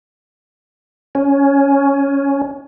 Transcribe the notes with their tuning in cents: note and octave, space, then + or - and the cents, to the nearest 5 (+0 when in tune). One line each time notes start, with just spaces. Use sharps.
C#4 +10